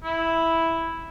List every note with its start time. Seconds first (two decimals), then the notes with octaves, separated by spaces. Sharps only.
0.04 E4